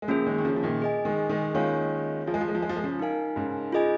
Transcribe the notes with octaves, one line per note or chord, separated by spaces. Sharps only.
G#3
C#3 F3 A#3 C#4 G#4
D#3 G#3
D#3
C#3 F3
F3
A#2 D#3
G#4 D#5 G#5
D#3 G#3
D#3 G#3
D#3 G#3 A#3 C#4 F4 C#5 F5
F3 F4 G#4 F5 G#5
G#3
F3
G#3
F3
G#3
F3
G#3
C#3 F3
D#4 A#4 F5 G#5
G#2 C#3
F4 G#4 D#5 G#5